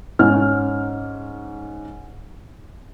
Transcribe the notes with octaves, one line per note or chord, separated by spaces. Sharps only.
G#2 C#4 F6